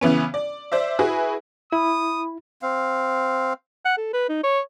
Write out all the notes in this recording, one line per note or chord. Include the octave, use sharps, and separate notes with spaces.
C#3 E3 B3 C#4
D5
C5 D5 E5
E4 F#4 G#4 B4
E4 B5 D#6
C4 F5
F#5
A4
B4
D#4
C#5